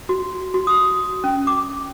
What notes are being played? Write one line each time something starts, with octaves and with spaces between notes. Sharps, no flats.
F#4
F#4
D#6
C#4
D6